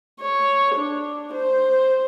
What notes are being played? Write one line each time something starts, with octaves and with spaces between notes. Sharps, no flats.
C#5
D4
C5